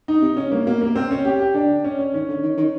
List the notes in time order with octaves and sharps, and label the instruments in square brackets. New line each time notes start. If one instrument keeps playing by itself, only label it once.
[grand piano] D#4
[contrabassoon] C3
[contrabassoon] C#3 [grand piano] C#4
[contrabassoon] G2 [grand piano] A#3
[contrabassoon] B2 [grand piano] A#3
[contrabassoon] C3 [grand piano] A#3
[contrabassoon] C#3 [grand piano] C4
[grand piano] C#4
G4
G4
[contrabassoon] D3 [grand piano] D4
[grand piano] C#4
C#4
[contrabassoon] D#3 [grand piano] C#4
[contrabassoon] D3
D#3
D#3